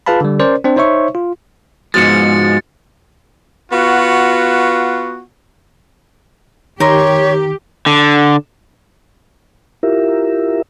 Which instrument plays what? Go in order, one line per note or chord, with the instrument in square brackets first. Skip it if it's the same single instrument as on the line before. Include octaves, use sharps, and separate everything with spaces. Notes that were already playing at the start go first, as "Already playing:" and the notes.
[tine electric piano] F4 G#4 B4 F5 A5 B5
D3 G3
C#4 A#4 C5 D5
C4 D4 C5
D#4 C5 C#5 E5 C#6
F4
[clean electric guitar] G#2 F3 G#3 [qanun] B2 [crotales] A6 C#7
[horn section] B3 F4 F#4
[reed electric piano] D#3 D6 [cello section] G4 [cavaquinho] A#4 C6 [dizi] C#5
[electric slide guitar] D3
[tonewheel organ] E4 F4 G4 A#4 E5